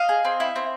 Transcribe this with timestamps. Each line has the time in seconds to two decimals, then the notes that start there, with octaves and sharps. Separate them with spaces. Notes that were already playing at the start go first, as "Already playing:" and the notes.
Already playing: D#5 F5
0.09 G#4
0.25 C4
0.40 E4
0.56 C4